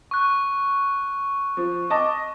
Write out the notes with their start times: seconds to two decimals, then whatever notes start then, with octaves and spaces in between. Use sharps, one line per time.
0.11 C#6 F#6
1.57 F3
1.90 D#5 A5 D6